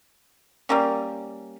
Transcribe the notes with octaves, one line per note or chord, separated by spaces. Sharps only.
G3 A#3 C#4